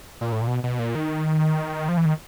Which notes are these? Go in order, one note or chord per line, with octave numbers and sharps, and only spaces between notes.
A#2
A2
A#2
B2
B2
A#2
D#3
F3
E3
D#3